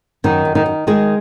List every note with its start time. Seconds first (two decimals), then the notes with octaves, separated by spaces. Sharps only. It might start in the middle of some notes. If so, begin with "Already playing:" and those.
0.24 F#2 D#3 D#4
0.45 F#2
0.55 D#3 D#4
0.66 D#3
0.87 D#3 G#3 G#4